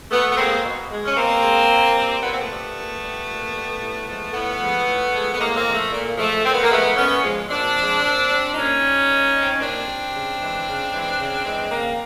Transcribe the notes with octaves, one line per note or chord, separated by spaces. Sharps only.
B2 A3 B3
B3
G#3 A#3 C4
B2
G#3
C#4
B2 A#3 C4
G#3
A#2
G3
A#2 B3
C4
A3 B3
G3
A#2
G3
A#2
G3
A2
F3 G#3
A2 A3 B3
F3 G#3
A2
F3 G#3
B3
A2 G#3 A#3
A#3 C4
F3 G#3
A3
A#2
F3 G#3 A3
A#2 C4
B3
A#3
F3 G#3 A3 B3
A#2 B3 C#4
F3 G#3
A#2 C4 D4
F3 G#3
A#2
G3
A#2 C#4 D#4
G3
A#2
G3
C4
C#4
A#2 C4 D4
G3
C#3
E3 G#3
C#3
E3 G#3
C#3
E3 G#3
C#3 A#3 C4